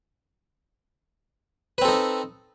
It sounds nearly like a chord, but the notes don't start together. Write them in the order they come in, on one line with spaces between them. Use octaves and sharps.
B4 C4 A4 D#4